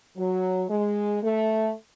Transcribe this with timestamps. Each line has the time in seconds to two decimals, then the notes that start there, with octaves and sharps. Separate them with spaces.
0.17 F#3
0.70 G#3
1.23 A3